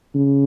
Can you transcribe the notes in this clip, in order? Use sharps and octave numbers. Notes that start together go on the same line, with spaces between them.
C#3